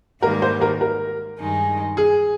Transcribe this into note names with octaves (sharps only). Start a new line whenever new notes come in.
G#2 D#3 G3 A#3 A#4
C5
A#4
A#4
G2 D#3 G#3 D#4
G#4